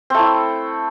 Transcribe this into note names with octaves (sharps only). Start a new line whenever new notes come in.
A3 C4 E4